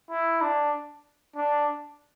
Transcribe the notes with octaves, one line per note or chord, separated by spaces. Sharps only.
E4
D4
D4